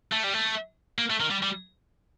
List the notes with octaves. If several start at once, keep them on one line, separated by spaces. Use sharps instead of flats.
A3
G3
A3
A#3
A3
D#3
G3
G3